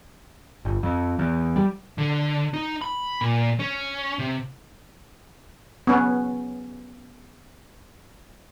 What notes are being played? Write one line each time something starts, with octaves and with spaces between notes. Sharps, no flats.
G1
F2
E2
G3
D3
D#4
B5
A#2
C#4
C3
B3 C#4